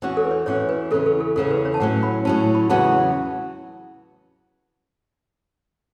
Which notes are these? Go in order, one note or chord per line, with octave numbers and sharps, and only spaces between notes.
E2 E3 C#4 F#4
A4
B4
C#5
E2 E3 C#4 F#4 C#5
B4
E2 C#3 E3 C#4 A4
A4
A4
E2 C#3 E3 C#4 A4
B4
C#5
A5
A2 F#3 C#4 F#5
B5
A2 F#3 C#4 A5
A5
B5
E2 C#3 F#3 B3 F#4 A5